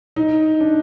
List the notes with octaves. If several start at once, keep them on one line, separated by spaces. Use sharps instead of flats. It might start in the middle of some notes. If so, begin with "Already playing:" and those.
D#4
D4